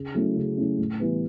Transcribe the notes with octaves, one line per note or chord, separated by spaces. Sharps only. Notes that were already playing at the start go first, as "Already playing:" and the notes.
Already playing: C#3
F#3 A3 C#4 E4
C#3
F#3 A3 C#4 E4
A2
E3 G3 B3